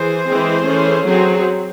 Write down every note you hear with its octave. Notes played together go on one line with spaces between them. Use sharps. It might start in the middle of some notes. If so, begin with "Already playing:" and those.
Already playing: E3 G#4 C5
E3 G#3 C4
E3 A3 C#4
F#3 C4 G#4 C5